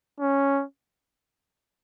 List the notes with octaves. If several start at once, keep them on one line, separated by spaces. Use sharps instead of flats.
C#4